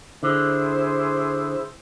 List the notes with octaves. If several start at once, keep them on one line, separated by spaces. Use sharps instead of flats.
D3 E4 G#4 C5